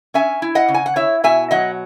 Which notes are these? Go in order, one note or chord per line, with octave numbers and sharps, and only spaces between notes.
C#4 E5 G#5
E4
D#5 F#5
C#3
G#5
F#5
E4 C#5 E5
B2 E5 G#5
F#3 D#5 F#5